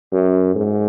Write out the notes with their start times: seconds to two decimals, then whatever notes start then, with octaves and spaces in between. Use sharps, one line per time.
0.12 F#2
0.55 G#2